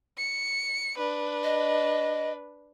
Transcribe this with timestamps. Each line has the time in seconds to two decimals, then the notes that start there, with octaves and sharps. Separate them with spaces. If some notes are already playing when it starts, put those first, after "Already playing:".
0.18 C#7
0.98 D4 B4
1.44 D#5